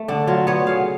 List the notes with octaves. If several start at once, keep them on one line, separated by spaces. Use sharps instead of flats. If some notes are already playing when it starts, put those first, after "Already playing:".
Already playing: A3
D3 D4
F#3 F4
B3 C#5
C#3 F5